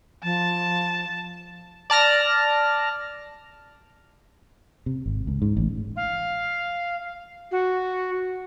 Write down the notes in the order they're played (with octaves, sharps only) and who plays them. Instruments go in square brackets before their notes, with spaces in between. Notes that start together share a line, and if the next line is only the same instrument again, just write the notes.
[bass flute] F3 [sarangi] A5
[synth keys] D5 A5 F6 A#6
[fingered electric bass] C3
G#1
C#2
G#2
A1
[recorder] F5
F#4